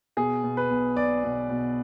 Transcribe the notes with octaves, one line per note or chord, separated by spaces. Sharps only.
B2 G#4
B2
B4
B1
B1 D5
B2
B2